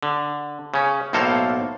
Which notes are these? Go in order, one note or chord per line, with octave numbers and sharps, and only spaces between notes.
D3
C#3 C#4
B1 A2 A#3 A4 C5 F5